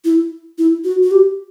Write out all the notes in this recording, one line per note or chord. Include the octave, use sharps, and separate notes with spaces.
E4
E4
F#4
F#4
G4